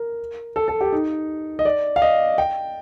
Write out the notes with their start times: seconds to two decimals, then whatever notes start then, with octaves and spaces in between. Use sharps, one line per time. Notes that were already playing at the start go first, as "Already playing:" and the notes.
Already playing: A#4
0.56 A4
0.68 A4
0.81 G4
0.92 D#4
1.59 D#5
1.65 D5
1.96 F5
2.02 D#5
2.38 G5